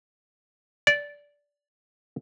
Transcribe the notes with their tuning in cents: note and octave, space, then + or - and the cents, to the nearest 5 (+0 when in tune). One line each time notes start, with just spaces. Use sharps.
D5 -15